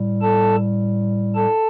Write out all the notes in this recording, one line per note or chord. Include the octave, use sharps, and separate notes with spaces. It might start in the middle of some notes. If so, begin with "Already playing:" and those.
Already playing: A2 G3
A4 A5
A4 A5